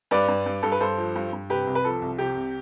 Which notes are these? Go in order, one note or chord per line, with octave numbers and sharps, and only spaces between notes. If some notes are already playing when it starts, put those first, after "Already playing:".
G2 B4 D5
G2
G2
G2 A4
B4
G2 A4 C5
F3
G2
G2
C3 G4 B4
C2
B4
F3 A4
C2
C3 G4
C2